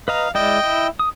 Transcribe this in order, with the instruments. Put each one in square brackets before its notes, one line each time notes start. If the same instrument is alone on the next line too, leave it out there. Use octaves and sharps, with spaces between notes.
[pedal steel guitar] B4 D#5 A#5 [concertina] F5
[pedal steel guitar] G#3 E4 D5 [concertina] D#5 G5
[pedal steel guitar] E4
D#6